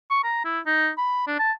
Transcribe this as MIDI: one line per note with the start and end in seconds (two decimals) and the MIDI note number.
0.10 0.21 85
0.24 0.40 82
0.45 0.59 64
0.66 0.90 63
0.97 1.25 83
1.27 1.36 62
1.39 1.52 81